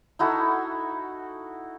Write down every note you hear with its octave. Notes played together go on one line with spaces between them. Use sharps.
D#4 E4 F#4 A4